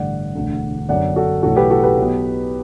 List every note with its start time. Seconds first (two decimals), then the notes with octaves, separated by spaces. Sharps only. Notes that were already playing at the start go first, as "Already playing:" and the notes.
Already playing: A1 G2 D3 D5 F#5
0.35 E1 D2 D3
0.89 G1 F#2 D3 D5 F#5
1.16 F#4 A4
1.43 B1 A2 E3 F#4 A4
1.56 G4 B4
1.70 F#4 A4
1.84 G4 B4
1.97 B1 B2